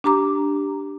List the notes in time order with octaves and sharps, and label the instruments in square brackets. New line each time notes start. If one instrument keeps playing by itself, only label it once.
[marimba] D4 G4 A#5 D6